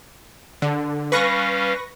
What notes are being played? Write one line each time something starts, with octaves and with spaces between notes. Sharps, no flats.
D3
G3 C#4 B4 F5 C#6 A#6